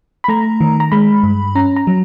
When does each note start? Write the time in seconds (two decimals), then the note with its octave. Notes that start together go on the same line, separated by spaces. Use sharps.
0.24 B5
0.28 A3 A#5
0.61 D#3
0.80 A#5
0.92 G#3 B5
1.23 G2
1.55 C#4 A#5
1.76 A#5
1.87 F#3